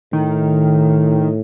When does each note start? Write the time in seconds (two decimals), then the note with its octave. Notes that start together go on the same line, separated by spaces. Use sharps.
0.13 A2 D#3